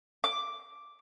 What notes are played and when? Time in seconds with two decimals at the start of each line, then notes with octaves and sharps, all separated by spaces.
0.24 D6